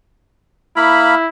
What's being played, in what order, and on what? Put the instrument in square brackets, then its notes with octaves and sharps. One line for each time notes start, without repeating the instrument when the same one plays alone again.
[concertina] A#3 F5 B5 [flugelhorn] E4